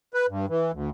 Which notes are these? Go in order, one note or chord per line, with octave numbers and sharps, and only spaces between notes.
B4
G2
E3
D2